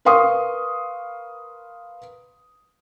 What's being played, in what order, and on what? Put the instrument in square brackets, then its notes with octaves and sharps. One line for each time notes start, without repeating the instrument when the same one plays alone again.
[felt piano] A#4 B4 F5 C6 C#6 D#6